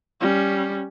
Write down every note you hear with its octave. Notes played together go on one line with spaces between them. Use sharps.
G3 C#4